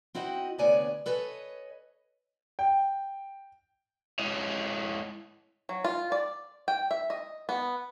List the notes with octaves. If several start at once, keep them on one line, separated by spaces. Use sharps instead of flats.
C4 E4 F#4 D#5 G5
D2 C3 B3 C#5 D5 G#5
A4 B4 C#5 D#5 G#5
G5
G#3 E4 C#5 D#5
F#3
F4
D5
G5
E5
D#5
B3